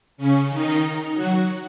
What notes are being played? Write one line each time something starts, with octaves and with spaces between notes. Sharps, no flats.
C#3 C#4
D#3 D#4
F#3 F#4